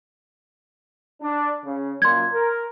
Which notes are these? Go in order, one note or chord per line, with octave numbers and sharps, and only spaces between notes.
D4
C#3
F#2 A#2 C6 G#6
A#4